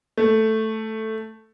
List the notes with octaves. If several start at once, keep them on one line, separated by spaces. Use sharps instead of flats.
A3